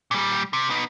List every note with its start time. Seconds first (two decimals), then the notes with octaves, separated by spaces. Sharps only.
0.11 A#2 G3
0.53 C3
0.70 B3 D#4